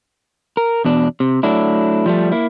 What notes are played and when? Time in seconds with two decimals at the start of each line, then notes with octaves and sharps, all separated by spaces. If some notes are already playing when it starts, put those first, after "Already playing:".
0.57 A#4
0.85 E2 B2 D4
1.20 C3
1.43 F#3 A3 D4 E4
2.06 F3 G3 A3
2.32 A#3 E4